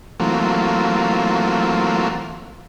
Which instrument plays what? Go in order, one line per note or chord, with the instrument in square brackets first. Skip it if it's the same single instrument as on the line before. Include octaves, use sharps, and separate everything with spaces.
[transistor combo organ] E3 F#3 A3 A#3 C4 F4